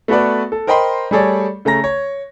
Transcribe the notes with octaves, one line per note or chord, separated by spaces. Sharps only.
A3 B3 F#4 A4 B4 D5
A4
A#4 C5 D#5 G5 B5 C6
G3 A3 G#4 A4 C#5 D5
C#3 A3 C#4 A#5 A#6
C#5